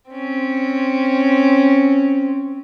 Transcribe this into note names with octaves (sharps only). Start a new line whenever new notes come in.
C4 C#4